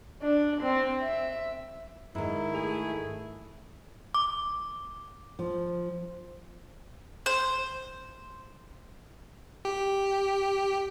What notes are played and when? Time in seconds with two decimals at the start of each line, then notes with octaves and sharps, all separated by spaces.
0.22 D4
0.62 C4
1.03 E5
2.15 G#2 D#3 G#3 E4
2.54 A3 G#4
4.14 D6
5.39 F3
7.26 C5
9.65 G4